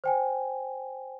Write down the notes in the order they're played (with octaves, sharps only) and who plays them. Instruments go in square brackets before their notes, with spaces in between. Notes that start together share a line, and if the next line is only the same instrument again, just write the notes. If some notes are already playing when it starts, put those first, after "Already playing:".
[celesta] C5 G5 G#5